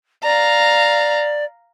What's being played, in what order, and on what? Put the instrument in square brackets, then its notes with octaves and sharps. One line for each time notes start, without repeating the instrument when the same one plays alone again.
[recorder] D5 [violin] F5 A#5